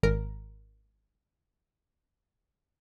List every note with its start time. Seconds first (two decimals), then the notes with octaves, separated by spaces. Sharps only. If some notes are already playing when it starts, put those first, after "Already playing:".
0.03 G#1 A#4